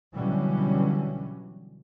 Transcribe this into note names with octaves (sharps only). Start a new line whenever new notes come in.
B2 D3 E3 F#3 G3 C#4